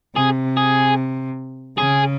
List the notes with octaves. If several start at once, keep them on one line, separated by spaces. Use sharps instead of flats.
C3 G#4
G#4
C#3 G#4